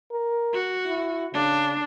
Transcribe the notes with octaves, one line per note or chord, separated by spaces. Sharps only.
A#4
F#4
E4
C#3 D4